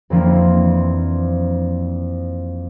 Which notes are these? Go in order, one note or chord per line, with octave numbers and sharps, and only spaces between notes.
F2 E3 F3 A#3 C4 D4